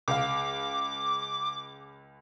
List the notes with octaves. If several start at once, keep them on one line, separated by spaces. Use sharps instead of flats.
C#2 F5 D6